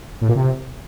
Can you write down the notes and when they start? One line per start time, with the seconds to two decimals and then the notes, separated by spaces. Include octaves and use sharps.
0.21 A2
0.28 A#2
0.35 C3